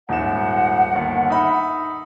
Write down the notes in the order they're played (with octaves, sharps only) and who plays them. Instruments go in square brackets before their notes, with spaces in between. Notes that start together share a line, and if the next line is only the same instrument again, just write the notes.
[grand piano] D#1 G#2 E7 [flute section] F#5
[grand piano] G1 D#2
D#4 E5 B5